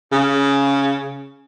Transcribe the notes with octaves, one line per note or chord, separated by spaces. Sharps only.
C#3